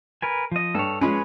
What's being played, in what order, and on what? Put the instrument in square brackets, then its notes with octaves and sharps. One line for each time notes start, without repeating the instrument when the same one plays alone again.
[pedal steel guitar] A#4 B4 G#5
F3 D#5
[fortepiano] G2 [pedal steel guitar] A4 C#5
[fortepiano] F3 G#3 C#4 [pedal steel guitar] G#4 B4 C#5